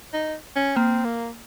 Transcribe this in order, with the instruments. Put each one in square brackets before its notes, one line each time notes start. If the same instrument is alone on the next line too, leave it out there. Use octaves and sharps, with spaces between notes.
[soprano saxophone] D#4
C#4
[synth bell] A#3 [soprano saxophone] C4
[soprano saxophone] A#3